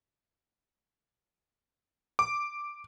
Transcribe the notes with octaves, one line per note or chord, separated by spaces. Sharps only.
D6